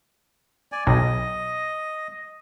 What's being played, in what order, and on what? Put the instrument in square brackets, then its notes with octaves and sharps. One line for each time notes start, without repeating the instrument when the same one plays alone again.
[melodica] D5 G#5
[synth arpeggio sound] B1 [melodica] D#5